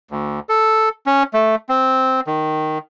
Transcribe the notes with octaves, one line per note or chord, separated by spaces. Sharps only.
D2
A4
C#4
A3
C4
D#3